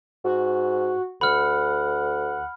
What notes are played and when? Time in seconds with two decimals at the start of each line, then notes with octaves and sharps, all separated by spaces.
0.24 G#2 F#4
1.21 D2 F#5 B5 F6